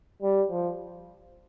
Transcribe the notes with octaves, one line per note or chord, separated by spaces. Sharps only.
G3
F3